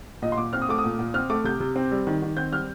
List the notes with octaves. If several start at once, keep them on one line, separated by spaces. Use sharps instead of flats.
A#2 D#5
C6
A#2 D6
C4 F6
D#6
A3 D6
D#6
A#2
A#2
C4 F6
A3 D6
C3 G6
C3
C4
G3
D#3
D#3
C4 G6
G3 F6